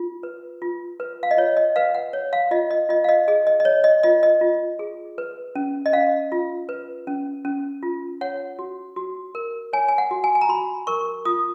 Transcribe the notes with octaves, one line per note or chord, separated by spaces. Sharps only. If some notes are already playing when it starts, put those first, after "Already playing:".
Already playing: F4
B4
F4
B4
F5
D#5
F4 C#5
D#5
B4 F5
F#5
C#5
F5
F4 D#5
D#5
F4 D#5
F5
D#5
G#4 D#5
D#5
D#5
C#5
D#5
F4 D#5
D#5
F4
G#4
B4
C#4
D#5
C#4 F5
F4
B4
C#4
C#4
F4
C#5 F#5
F#4
F#4
A#4
C#5 G#5
G#5
F#5
F#4
G#5
G#5
A#5
F#4 B5
A#4 C#6
F4 D#6